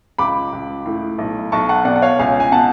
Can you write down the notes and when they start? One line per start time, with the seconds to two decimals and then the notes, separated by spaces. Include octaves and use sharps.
0.18 C#2 B5 D6
0.53 C#2
0.86 A2
1.18 B1
1.52 B1 A5 C#6
1.69 F#5 A5
1.85 B2 D5 F#5
1.96 F#5
2.02 C#5 F5
2.19 C#2 F5 G#5
2.40 G#5
2.52 B2 F#5 A5